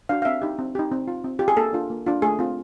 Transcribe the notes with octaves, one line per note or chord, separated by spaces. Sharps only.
D4 F#4 F5
F5
C4 E5
D#4 G4
C4
D#4 G4
C4
F4
C4
F4 G4
G#4
A#3 A4
D4 F4
A#3
D4 F4
A3 G#4
C4 F4